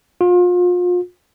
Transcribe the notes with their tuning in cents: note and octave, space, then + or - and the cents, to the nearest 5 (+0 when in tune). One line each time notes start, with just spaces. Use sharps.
F4 +35